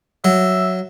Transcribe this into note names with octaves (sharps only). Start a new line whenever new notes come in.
F#3 E5